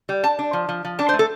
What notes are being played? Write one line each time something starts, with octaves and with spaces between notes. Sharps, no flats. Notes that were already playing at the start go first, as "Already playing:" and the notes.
G3
D4 A5
D4
F3
F3
F3
D4 A5
C5
A3
A4